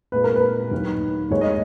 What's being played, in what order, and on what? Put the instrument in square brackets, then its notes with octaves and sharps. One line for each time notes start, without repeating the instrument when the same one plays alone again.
[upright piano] A#2 G#3 B4
A#4
B4
D#2 D#3 F#3
D#2 D#3 G#3 C#5
D#5